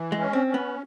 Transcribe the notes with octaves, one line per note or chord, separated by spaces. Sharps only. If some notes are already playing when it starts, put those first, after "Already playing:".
Already playing: E3
G#3
C#4
C4
C#4
B3